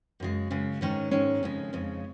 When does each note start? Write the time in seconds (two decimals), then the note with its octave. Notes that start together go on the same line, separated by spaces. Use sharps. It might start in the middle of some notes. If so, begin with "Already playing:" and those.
0.20 F#2 C#3 G#3
0.51 F#2 C#3 G#3
0.81 G#2 D#3 G#3 C#4
1.11 G#2 D#3 G#3 C#4
1.43 F2 C#3 G#3
1.73 F2 C#3 G#3